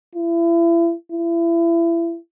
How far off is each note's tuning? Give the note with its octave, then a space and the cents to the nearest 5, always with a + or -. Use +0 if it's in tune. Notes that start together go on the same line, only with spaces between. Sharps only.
E4 +35
E4 +30